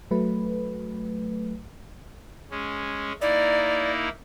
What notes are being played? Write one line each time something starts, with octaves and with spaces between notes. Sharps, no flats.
F#3 A3 B4
G#3 C#4
A#3 D#4 E4 D5